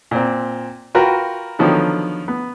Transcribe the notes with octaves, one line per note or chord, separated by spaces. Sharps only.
A#2 C4
F4 F#4 A#4 B4 G5
D3 D#3 F3 F#3 B3 D#4
B3